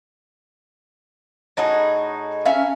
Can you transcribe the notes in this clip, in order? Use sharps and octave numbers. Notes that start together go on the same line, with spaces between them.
A2 D#4 F#4 G#4
C#4 E5 F5